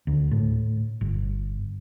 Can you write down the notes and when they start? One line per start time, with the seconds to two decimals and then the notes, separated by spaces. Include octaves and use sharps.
0.07 D2
0.31 A2
1.01 G1